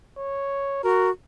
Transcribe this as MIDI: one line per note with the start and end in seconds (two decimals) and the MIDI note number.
0.17 0.82 73
0.83 1.11 66
0.83 1.09 70